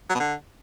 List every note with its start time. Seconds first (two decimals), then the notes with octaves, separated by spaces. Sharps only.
0.10 F#3
0.15 B2
0.20 D3